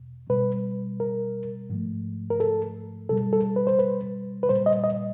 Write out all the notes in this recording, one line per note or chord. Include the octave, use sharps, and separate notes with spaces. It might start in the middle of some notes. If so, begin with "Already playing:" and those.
Already playing: E2 B2
B2 G3 B4
A#4
G#2 F3 A3
A#4
A4
B2 G3 A4
A4
B4
C5
B4
B4
A#2 G3 C5
D#5
D#5